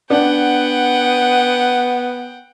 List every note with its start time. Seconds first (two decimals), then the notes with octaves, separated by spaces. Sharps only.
0.10 B3 D4 F#5 G5